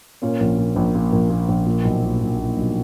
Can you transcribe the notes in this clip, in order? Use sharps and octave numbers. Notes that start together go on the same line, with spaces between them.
A#2 C#4
A#1
A#2
A#1
A#2
A#1
A#2
A#1
A#2
B1
A#2
B1
A#2
B1